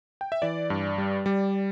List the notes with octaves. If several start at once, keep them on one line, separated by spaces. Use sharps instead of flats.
G5
E5
E3 D5
G2
G3
G3